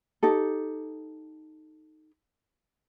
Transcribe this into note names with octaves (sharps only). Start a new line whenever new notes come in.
D#4 G4 A4